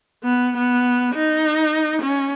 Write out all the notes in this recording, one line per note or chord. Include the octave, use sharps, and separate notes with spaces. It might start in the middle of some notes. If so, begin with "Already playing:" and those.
B3
B3
D#4
C#4